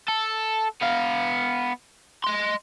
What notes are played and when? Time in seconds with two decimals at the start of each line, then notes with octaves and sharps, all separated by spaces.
0.08 A4
0.82 B3 F5
2.24 D#5 C6